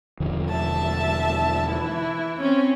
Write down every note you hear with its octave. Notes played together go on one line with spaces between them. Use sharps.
E1 D3 F3
E5 A5
E3 E4
C4 C#4